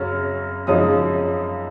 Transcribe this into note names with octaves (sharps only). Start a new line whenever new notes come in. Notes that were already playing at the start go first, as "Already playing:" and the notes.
Already playing: F#2 C#3 F#3 C#4 F6
F#2 C#3 F3 G#3 D#4 D#6